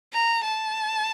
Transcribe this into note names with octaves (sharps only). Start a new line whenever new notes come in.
A#5
A5